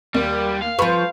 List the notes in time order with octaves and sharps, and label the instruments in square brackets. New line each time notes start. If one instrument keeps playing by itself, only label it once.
[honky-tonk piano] D#2 [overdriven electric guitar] G3
[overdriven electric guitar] F5
[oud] F3 B4 [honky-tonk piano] B5 C#6